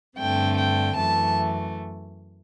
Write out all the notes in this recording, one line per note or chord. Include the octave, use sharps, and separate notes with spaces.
G2 D3 A3 C4 G5
G5
F#2 E3 A3 A5